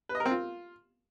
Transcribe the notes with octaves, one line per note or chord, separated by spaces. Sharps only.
B4
D#5
A#4
C4
F4